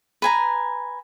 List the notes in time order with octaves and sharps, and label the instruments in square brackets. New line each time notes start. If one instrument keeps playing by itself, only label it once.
[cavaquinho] B4 G#5 A#5